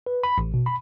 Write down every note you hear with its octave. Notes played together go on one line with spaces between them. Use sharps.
B4
B5
A1
B2
B5